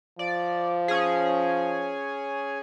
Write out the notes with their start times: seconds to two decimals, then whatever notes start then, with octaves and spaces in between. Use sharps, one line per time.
0.19 F3 D5
0.88 C#4 G#4